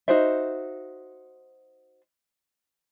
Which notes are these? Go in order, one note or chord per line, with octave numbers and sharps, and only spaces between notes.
D#4 F#4 C5 E5